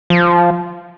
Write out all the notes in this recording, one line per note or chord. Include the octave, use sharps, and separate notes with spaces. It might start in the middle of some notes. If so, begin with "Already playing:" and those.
F3